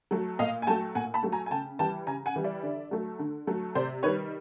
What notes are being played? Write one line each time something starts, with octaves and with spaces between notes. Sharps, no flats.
F#3 A3
A#2 D#5 F5
G#5
F#3 A3 G5 A5
A#2 F#5 G#5
A5 B5
F#3 A3
G#5 A#5
G#5
C#3 G5 A5
E3 G3 G5 A5
C#3 G#5 A#5
F#5 G#5
E3 G3
D5 E5
D3
F#3 A3
D3
F#3 A3
C3 C5 D5
D#3 G3 B4 C#5